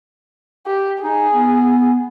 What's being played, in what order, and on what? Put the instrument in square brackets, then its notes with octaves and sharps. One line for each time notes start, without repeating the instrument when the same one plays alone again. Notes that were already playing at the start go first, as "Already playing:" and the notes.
[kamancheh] G4
[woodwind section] D#4 [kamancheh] G#4
[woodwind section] B3